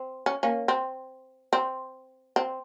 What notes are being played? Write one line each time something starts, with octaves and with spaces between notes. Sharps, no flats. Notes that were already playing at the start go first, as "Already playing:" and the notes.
Already playing: C4
C#4
A#3 C#4
C4
C4
C4